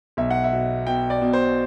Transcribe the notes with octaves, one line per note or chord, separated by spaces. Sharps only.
B1 E5
F#5
E5
B2
B2 G5
D5
B2
C5